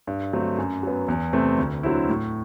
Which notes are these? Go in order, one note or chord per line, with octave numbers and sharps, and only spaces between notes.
G2
D3 F#3 A3 C4
F#2
F#3 B3
E2
C3 E3 A3 C4
D2
D3 F#3 C4 E4
A2